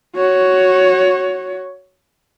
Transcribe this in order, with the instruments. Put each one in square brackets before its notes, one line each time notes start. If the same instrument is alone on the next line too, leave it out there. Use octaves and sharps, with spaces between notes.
[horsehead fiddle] F#4 C#5